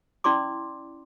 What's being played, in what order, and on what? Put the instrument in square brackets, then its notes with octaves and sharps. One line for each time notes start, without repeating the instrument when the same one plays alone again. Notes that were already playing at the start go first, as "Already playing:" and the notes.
[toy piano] C#4 E4 D5 C6 D6